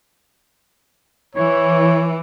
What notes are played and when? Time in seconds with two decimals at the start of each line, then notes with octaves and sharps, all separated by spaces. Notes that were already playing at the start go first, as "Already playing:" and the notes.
1.35 E3 C#5